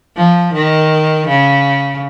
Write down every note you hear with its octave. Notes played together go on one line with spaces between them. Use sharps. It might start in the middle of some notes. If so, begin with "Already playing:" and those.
F3
D#3
C#3